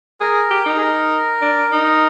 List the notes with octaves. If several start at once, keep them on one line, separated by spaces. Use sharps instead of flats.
G#4 A#4
G4
D#4
G#4
A#4
D4
D#4